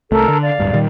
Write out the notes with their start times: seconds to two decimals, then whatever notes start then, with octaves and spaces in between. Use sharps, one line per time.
0.12 C2 A3 A4 A#4
0.28 D3
0.42 D5 F5
0.60 D1 G2
0.73 A#2 D#3 G3